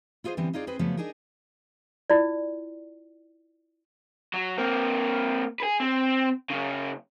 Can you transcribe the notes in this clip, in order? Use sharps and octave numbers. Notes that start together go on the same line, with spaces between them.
E4 F4 G#4 C5 D#5
D3 E3 G3 B3 C4
D#4 F4 G#4 D5
C4 G#4 B4 C5
C#3 F3 F#3 A3 B3
D4 D#4 G#4 A#4
E4 F4 D5
F#3
A#3 C4
G#4 B4
C4
F#2 C#3